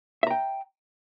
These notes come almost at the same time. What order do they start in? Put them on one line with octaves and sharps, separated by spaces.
E5 A#5 G5